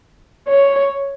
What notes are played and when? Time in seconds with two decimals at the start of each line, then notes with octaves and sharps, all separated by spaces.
0.48 C#5